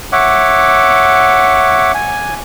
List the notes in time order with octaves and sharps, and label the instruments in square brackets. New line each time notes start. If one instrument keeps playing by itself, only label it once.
[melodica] C#5 E5 F#5 D6
G#5